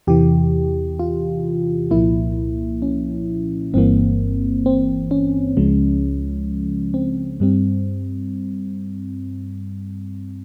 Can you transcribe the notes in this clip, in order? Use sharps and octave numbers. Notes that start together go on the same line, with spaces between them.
E2 C3 E3 G4
F4
C2 A#2 F3 A#3 E4
C#4
G1 G2 E3 A#3 C4
C4
C#4
C#2 C#3 F3 G#3
C4
G2 G3 C4